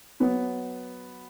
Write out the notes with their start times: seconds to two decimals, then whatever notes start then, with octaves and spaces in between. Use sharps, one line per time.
0.20 F#3 B3